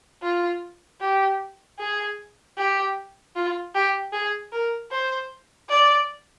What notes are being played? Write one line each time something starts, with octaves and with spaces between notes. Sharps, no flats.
F4
G4
G#4
G4
F4
G4
G#4
A#4
C5
D5